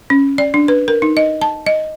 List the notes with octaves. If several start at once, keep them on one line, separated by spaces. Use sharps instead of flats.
C#4
D5
D4
B4
A#4
D#4
D#5
A5
D#5